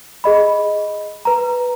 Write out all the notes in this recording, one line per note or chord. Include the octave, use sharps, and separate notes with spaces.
G#4 D#5 B5
B4 A#5